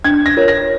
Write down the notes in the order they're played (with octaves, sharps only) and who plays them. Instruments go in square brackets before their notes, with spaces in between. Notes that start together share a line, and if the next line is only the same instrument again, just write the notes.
[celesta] D4 [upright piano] G#6
[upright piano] A#6
[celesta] F4 A#4 C#5
[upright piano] A#6